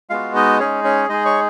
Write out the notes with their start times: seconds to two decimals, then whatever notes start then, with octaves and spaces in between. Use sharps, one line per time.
0.10 G#3 B3 F4 F#4 F5
0.35 D#4 D#5
0.60 G#3 C#4 D#4 G#4 C#5
0.84 C#4 C#5
1.09 G#3 D#4 G#4 D#5
1.25 C#5 C#6